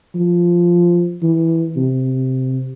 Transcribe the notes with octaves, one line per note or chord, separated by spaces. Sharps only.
F3
E3
C3